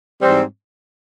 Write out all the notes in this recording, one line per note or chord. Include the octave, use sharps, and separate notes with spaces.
G#2 E3 G3 C4